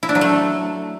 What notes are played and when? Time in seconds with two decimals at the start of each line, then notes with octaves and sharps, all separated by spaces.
0.03 E4
0.09 D4
0.15 F#3
0.21 A3